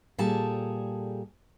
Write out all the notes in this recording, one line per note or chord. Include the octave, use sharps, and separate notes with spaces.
A#2 G3 G#4 A4 A5